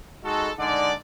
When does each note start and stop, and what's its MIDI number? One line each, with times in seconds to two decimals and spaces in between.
0.24 0.49 56
0.24 0.49 63
0.24 0.49 66
0.24 0.49 69
0.58 0.91 50
0.58 0.91 56
0.58 0.91 63
0.58 0.91 74